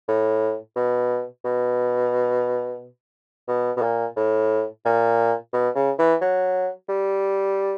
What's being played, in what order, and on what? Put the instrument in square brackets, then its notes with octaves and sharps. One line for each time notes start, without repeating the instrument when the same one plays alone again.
[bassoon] A2
B2
B2
B2
B2
A#2
A2
A#2
B2
C#3
E3
F#3
G3